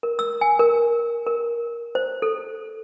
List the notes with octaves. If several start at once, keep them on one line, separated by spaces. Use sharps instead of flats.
A#4
E6
G#5
A#4
A#4
C5
A4